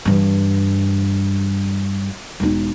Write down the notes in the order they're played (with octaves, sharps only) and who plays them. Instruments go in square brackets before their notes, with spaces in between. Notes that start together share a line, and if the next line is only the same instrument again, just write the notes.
[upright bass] G2 E3
E1 D#4